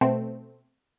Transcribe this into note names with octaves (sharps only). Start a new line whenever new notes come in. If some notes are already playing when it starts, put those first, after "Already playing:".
B2 A3 C4